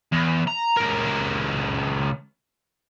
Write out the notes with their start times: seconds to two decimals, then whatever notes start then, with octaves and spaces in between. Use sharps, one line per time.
0.12 E2
0.48 A#5
0.77 C#2 A#4